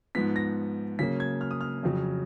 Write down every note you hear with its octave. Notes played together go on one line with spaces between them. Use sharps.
G#2 F3 B3 B6
A#6
C#3 F#3 A#3 C#4 B6
G#6
F6
D#6
F6
F2 C#3 F#3